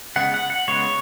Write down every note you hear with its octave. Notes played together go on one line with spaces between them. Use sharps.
C#3 G#3 B3 F#5
F#5
F#5
C#3 G#3 B3 C#5